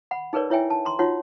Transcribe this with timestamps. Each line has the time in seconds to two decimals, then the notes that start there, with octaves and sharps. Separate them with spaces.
0.11 F#5 B5
0.33 D#4 G#4 A#4 B4 C#5 D5
0.50 E4 C#5 E5 G5 G#5
0.70 A5
0.85 A#5 C6
0.99 D#4 F4 F#4 C#5 F#5 C6